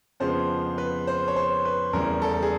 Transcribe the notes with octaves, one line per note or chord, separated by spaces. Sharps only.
F2 C#3 F3 G#3 B3 C5
B4
C5
C#5
C5
B4
E2 C#3 E3 G3 A#4
A4
A4
G#4